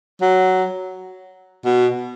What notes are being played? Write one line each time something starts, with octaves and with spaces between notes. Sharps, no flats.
F#3
B2